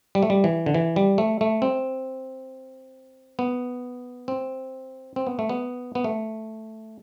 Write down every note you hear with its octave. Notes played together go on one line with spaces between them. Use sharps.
G3
A3
G3
E3
D3
E3
G3
A3
A3
C4
B3
C4
C4
B3
A3
B3
B3
A3